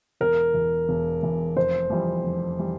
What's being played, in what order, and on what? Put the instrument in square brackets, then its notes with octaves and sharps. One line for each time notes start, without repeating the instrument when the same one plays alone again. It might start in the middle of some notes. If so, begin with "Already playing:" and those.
[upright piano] E1 [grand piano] A#4
[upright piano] E2 E3
E1
E2 E3
[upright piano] F1 [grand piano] C5
[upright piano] F2 E3 G3
F1
E3 G3